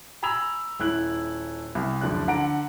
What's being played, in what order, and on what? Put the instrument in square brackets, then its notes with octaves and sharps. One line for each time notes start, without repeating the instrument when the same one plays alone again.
[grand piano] G#5 A#5 B5 E6 G#6 F7
D#1 E4 F#6 F#7
C2
F#1 D2 F3 D5 F#6
D3 F#5 A#5 D7